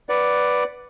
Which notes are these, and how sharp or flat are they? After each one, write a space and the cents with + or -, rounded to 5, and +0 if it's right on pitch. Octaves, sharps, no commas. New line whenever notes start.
B4 +0 D5 +0 F#5 +0